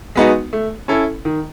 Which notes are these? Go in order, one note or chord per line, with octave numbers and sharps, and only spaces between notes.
G#3 B3 D#4 F#4
A3
C#4 E4 A4
D#3